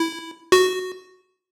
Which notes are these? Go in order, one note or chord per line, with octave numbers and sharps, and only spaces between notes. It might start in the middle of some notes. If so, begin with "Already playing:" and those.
Already playing: E4
F#4